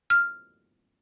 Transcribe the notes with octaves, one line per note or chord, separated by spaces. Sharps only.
F6